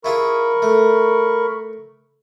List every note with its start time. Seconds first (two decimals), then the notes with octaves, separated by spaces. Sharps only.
0.05 E4 F4 G#4 A#4 B5 C#6
0.62 A3